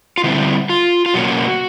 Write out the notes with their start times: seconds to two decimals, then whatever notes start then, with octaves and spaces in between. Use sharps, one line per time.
0.18 F4
0.23 D3 G3 C4 E4
0.69 F4
1.06 F4
1.14 B2 F#3 A#3 C#4 F#4